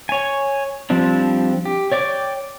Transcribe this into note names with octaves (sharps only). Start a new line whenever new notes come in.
C#5 G#5
F3 G3 C4 D4
G4
C#5 D5 G5 D6